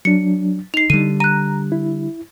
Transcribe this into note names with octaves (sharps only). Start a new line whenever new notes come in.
F#3 D4 C#7
D#4 C7 F7
D3 G3 D#7
A#5 F#6 D#7
E4